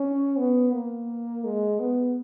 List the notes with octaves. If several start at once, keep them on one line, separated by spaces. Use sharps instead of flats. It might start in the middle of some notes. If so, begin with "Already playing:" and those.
Already playing: C#4
B3
A#3
G#3
B3